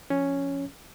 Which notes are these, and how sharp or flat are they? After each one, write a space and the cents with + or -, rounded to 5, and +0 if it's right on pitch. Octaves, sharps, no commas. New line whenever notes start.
F3 +0 C#4 +0